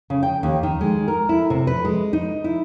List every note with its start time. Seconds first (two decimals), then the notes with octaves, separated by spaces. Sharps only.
0.10 C#3
0.23 G5
0.43 D#2
0.63 D#3
0.81 G#3
1.08 A#4
1.29 E4
1.50 C3
1.67 B4
1.85 G#3
2.13 D#4
2.44 E4